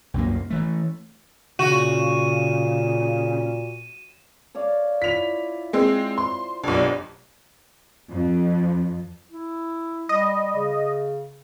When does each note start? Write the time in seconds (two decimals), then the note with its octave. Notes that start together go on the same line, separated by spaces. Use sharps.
0.14 C2 F#2 G3 A#3
0.50 E3 A3
1.59 A#2 C#3 F#4 D#7 E7
4.55 C#5 D5 F5
5.02 E4 F4 B6 F7
5.73 G#3 C4
6.18 C5 C6
6.63 F1 B1 D4
8.09 F2
9.31 E4
10.09 G3 D#5
10.56 C#3